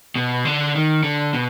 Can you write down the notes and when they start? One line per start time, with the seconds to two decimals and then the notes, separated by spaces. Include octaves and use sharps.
0.16 B2
0.45 D3
0.75 D#3
1.03 D3
1.33 B2